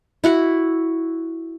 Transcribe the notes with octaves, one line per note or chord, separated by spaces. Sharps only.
E4 F#4 F#5